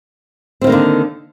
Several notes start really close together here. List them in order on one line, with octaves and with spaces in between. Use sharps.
C4 F3 D#3 A#3 D3